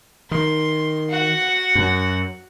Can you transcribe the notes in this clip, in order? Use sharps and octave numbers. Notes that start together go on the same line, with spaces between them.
D#3 C6
F#4 F#5
F#2